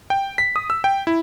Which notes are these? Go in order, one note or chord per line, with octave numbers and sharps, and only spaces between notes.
G5
B6
D#6
E6
G5
E4